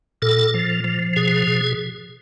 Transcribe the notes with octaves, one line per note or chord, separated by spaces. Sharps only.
A#2 A4
F3
F3
B2 G#4
B2